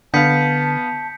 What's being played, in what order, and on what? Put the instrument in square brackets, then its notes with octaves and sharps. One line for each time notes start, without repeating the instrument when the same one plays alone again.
[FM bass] D3 [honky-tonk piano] B3 F5 [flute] A5 [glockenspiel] G6 B6 C#7